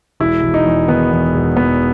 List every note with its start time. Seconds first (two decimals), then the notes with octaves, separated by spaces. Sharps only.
0.20 E1 E4
0.43 E1
0.54 D#4
0.66 E2
0.88 D#3 B3
1.11 E2
1.33 E1
1.56 E2 B3